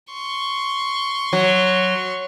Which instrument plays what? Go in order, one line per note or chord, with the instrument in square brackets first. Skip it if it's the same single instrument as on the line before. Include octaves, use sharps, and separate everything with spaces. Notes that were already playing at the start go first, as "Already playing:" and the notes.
[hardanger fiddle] C6 C#6
[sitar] F#3